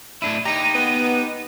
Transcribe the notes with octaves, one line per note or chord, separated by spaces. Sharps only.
A2 D4 E4 D#7
D#4 G4 A#5
B3